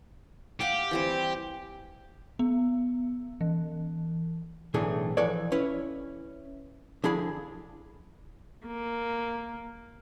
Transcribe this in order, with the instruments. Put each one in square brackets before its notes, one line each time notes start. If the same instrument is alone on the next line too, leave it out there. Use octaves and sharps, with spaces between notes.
[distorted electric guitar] G4 [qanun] F5 F#5
[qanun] E3 G3 C4
[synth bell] B3
E3
[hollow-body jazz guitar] B1 A2 E3 A3 D4 G#4
E3 F3 A4 B4 C#5 D5
C#4 E4 B4 C#5
D3 F3 E4 G#4 B5
[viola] A#3